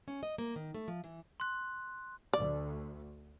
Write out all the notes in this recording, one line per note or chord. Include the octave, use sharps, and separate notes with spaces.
C#4
D#5
A#3
D#3
A3
F3
E3
C6 F#6
D2 D5